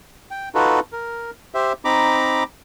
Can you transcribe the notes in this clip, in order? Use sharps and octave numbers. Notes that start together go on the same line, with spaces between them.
G5
D#4 F4 F#4 A4 B4
A#4
G4 C5 E5
C4 D#4 A#5 B5 D6